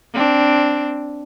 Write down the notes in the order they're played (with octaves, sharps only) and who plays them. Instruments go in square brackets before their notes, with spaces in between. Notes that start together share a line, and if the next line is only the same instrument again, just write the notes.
[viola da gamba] C4 D4